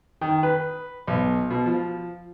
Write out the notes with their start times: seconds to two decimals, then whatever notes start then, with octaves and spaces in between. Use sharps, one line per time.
0.21 D#3
0.43 B4
1.07 B1
1.50 B2
1.66 F3